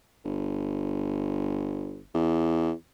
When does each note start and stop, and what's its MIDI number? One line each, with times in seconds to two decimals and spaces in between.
0.25 2.02 31
2.14 2.72 40